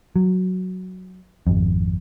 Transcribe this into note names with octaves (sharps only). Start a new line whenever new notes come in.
F#3
G#1 F2